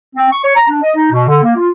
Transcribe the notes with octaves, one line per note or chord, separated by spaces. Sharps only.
C4
C#6
C#5
A#5
D4
D#5
D#4
B2
D3
A#3
F4